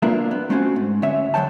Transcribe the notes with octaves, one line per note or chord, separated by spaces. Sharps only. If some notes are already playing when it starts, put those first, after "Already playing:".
A#3 D4 F4 A#4 B4 E5
B3
A3 C4 C#4 F#4
G#2
D2 C#4 C#5 E5
D2 F#3 C#5 G5 A5